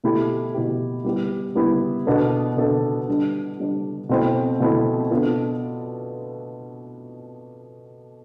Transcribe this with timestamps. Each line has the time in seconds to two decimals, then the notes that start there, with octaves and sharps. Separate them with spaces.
0.03 B2 A3 E4 G4
0.54 B2 A3 E4 G4
1.04 G3 B3 E4 G4
1.55 G3 B3 E4 G4
2.07 B2 B3 D4 A4
2.57 B2 B3 D4 A4
3.08 D3 G3 D4
3.59 D3 G3 D4
4.09 B2 A3 C4 E4
4.60 B2 A3 C4 E4
5.11 B2 B3 D4 F4 A4